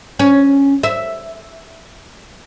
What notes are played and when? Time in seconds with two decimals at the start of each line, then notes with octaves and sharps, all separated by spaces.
0.19 C#4
0.83 E5